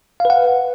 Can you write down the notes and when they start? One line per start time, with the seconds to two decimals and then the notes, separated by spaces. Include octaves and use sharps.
0.20 F5
0.25 B4
0.30 F#5